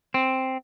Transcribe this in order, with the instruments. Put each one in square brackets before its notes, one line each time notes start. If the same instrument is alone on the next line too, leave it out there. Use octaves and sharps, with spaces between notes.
[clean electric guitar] C4